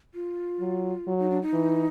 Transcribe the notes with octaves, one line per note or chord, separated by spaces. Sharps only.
F4
F#3
F#3
D#4
D4
D#4
E3